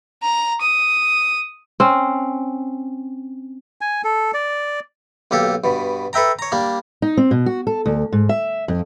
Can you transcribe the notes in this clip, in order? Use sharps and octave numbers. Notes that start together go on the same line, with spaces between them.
A#5
D#6
C4 C#4
G#5
A4
D5
B1 A#3 G4 A4
G2 B2
A4 B4 E5 G5 A#5
C#5 A#5
G3 A#3 D4
D#4
C4
B2
F#4
A4
D2
G#2
E5
F2